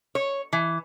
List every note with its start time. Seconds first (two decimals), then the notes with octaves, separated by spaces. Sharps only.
0.15 C#5
0.53 E3